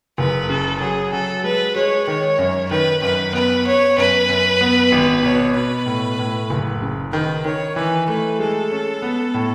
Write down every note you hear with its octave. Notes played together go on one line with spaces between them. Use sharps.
F#1 B4
C#3 A4
F#3 G#4
F#3 A4
G#3 B4
G#3 C#5
D#3 C#5
F#2
D#3 B4
F#2 B4
B3 B4
B3 C#5
F#2 B4
F#2
B3
G#1
B2 C#5
B2 B4
A2
A2
F#1
C#3
D#3 B4
D#3 C#5
E3 B4
A3 B4
G#3 A4
C#4
B3
A2